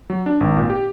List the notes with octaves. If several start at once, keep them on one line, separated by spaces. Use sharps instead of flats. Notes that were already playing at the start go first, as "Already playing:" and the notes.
F#3
D4
G#1
A#2
G4